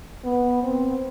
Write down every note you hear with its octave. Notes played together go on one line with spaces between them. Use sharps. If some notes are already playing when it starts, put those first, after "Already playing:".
B3
C4